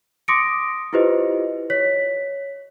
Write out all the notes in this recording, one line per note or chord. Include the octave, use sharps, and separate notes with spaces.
C6 D6 D#6 A#6 C#7 D7
E4 F4 G4 B4 C5 D#5
C#5 B6